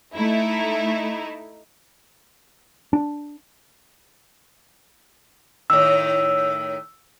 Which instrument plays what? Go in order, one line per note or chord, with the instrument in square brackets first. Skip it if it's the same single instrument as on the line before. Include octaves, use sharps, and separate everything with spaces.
[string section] A3 D#4 E4
[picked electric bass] D4
[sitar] A2 D#3 [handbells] E6